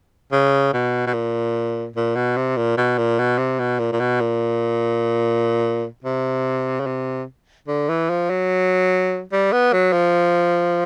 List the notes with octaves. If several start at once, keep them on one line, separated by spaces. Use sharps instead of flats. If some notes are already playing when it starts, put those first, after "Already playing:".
C#3
B2
B2
A#2
A#2
B2
C3
A#2
B2
A#2
B2
C3
B2
A#2
A#2
B2
A#2
C3
C#3
C3
D3
E3
F3
F#3
G3
B3
F#3
F3